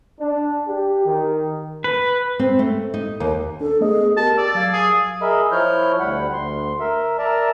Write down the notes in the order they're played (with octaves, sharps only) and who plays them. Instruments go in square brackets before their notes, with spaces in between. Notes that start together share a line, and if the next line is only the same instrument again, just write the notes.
[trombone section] D4
G4
D#3
[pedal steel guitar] B4
[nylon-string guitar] C4
A3
D#4
D#2
[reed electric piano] D4 [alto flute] A4
[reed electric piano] A3 B3 D#5 [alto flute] G#4
[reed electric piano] G4 [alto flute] A#4 [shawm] A5
[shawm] D5 [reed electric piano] E6
[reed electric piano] F#3 E6 G#6 [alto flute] F5
[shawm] G#4
[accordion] G#4 A#4 D#5 E5 B5
F3 E4 C#5 F6 G6
D2 G3 F#5 B5
D2 C6
A#4 E5
A#4 D5 E5 A5 A#5